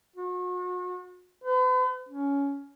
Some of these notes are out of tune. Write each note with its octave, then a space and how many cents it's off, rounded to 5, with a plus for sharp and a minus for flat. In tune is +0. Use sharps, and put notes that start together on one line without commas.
F#4 -40
B4 +45
C#4 +15